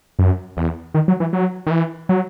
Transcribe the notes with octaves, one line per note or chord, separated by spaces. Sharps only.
F#2
E2
D#3
F#3
E3
F#3
D#3
E3
F#3